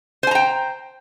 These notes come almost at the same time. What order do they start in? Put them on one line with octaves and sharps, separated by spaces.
C5 G#5 A#5 G5